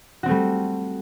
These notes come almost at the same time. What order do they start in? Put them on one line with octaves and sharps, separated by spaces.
F#4 C4 A3 G3